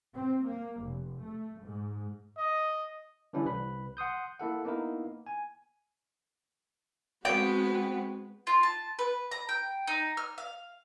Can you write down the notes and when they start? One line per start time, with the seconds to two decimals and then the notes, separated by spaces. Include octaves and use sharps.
0.14 C4
0.45 A#3
0.82 F1
1.23 A3
1.62 G#2
2.37 D#5
3.33 D3 E3 G3 C#4 D4 E4
3.46 C2 B4 B5
3.97 F#5 C6 D#6 G6
4.39 A#3 E4 A4 F#5
4.64 A#3 B3 D#4 E4 A#4
5.27 G#5
7.25 G#3 B3 C4 F#4 G5
8.47 F4
8.63 A5
8.99 B4
9.31 A#5
9.49 G5
9.87 D#4
10.17 F6
10.38 F5